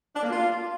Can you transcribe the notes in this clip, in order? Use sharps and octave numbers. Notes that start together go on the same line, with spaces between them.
D4
A#3
F4